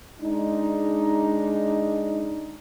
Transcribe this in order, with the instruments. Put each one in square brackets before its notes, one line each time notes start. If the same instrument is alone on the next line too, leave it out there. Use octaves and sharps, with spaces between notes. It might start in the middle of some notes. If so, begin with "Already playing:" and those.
[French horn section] G#3 D4 D#4